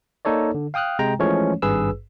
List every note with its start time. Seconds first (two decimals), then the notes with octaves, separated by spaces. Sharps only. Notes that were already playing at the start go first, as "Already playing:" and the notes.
0.25 A#3 D#4 A4 C#5 D5
0.54 D3
0.74 F5 G5 D#6 F6 F#6
0.99 C3 G#3 G5 A#5
1.19 E3 F3 G#3 A3 C#4 C#5
1.62 G#1 G2 G#4 B4 E6